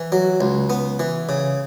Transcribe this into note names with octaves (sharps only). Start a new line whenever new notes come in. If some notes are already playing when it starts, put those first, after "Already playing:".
Already playing: E3
F#3
C#2
B3
E3
C#3